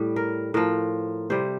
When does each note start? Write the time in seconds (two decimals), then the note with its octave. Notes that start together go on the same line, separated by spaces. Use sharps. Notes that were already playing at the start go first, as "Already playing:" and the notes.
Already playing: A2 G3
0.16 A#4
0.54 A2 F3 A#4
1.30 C3 G3 C5